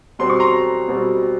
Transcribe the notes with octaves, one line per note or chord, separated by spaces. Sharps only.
B2 G3 C4 C6
C#6
A#5 C6
B2 G3 C4